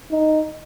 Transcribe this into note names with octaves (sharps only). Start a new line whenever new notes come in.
D#4